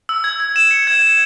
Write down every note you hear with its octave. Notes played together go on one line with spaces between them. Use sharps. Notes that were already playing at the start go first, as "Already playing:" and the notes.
E6
G#6
G#6
E7
C#7
G#6
G#6